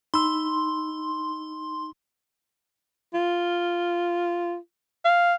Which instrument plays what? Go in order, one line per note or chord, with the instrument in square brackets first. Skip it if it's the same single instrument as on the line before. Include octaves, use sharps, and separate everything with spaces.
[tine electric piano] D#4 B5 E6 [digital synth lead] C6
[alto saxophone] F4
F5